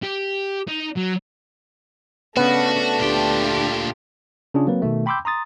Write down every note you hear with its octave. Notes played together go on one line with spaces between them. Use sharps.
G4
D#4
F#3
C#3 A3 B3 D4 F#4
D2 A#2 F4 G4 G5
C#3 C#4 D4 F4 G#4
F#3 A#3 C4 B4
B2 D#3 A3
G5 B5 C6 D6 E6 G6
A#5 C6 D#6 A6